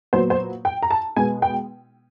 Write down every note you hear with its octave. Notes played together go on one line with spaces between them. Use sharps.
A#2 F#3 B3 C5
C5
G5
A#5
A5
B2 G#3 B3 G#5
G5